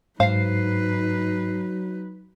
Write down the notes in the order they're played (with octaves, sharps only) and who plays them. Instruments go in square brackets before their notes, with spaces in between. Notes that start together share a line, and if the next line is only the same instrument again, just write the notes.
[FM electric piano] G#2 C7 [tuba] F#3 [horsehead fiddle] D#4 B4 [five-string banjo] C5 F5